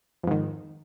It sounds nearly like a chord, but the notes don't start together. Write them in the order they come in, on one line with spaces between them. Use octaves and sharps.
F2 G#2 D#3